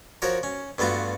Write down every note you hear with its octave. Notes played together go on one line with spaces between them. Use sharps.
F3 F#4 A#4 C#5
C#4
G2 A3 B3 F4 F#4